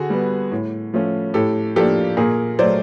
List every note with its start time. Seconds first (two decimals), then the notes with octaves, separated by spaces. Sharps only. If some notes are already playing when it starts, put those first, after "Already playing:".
Already playing: D3 F#4 G#4
0.10 G3 B3
0.52 A2
0.94 F3 A3 C#4
1.34 A2 G4 A4
1.76 F3 A#3 D4 G4 A4
2.17 A#2 G#4 A#4
2.59 F#3 A3 C5 D5